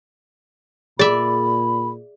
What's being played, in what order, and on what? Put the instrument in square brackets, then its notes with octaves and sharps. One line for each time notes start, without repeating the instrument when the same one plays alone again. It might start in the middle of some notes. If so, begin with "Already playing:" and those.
[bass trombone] A#2 [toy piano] G#4 [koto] D5 E5 [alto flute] B5